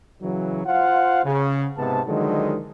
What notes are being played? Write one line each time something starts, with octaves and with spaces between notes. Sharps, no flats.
C#3 E3 F#3
F4 C5 F5 F#5
C#3
G#2 C3 B3 A5
D3 D#3 F3 F#3 G#3